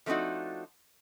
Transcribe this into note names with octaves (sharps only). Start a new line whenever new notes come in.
F3 A3 C4 D4 D#4 F#4